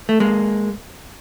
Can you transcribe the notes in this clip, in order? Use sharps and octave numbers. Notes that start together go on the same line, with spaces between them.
A3
G#3 A#3